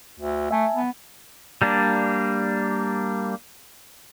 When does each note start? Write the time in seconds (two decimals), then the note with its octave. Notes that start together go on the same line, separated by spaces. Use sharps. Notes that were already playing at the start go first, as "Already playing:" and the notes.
0.19 D2
0.51 A3 E5 G#5 A5
0.75 B3
1.62 G3 A#3 D4